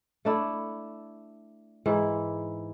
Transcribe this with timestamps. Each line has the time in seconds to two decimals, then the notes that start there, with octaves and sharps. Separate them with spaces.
0.25 A3 D4 E4
1.86 G#2 E3 E4